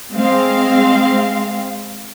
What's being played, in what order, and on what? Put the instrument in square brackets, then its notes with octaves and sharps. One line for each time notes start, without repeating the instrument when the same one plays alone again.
[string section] G#3 C4 F5